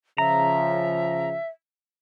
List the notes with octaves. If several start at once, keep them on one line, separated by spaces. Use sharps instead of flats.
C#3 F3 E5 A#5